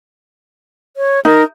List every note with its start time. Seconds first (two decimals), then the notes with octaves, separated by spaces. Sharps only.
0.97 C#5
1.25 D#4 A#4